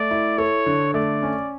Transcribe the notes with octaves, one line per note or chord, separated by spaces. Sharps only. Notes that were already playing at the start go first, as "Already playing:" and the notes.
Already playing: A3 D5
E4
A4 C#5
D3
A3 D5
C#4